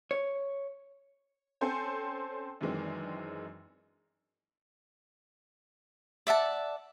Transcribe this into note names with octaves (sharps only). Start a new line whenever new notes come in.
C#5
C4 C#4 A4 C5 G#5
F#2 D#3 E3 G#3 C4 D4
D5 E5 F#5 A5